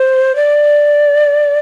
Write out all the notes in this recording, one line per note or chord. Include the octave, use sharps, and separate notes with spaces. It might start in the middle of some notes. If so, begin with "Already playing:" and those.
Already playing: C5
D5